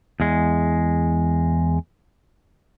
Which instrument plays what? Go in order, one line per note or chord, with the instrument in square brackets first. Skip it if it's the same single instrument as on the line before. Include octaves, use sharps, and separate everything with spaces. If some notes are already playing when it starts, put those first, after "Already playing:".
[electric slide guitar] E2 G#3